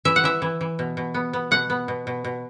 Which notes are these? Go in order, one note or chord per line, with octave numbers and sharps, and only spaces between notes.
E3 E5
F#5
E3 E5
E3
E3
B2
B2
B3
B3
B2 F#5
B3
B2
B2
B2